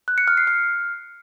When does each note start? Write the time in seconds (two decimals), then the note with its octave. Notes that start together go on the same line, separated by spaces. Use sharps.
0.08 F#6
0.18 C#7
0.28 F6
0.37 C7
0.47 F6